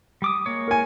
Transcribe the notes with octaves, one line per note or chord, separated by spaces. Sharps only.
G3 D6 D#6
G#3 A#3 C#5
A#4 G#5